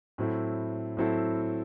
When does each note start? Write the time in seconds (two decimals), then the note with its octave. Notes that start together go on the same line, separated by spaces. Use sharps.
0.18 A2 F#3 C4 E4 A4
0.97 A2 F#3 C4 E4 A4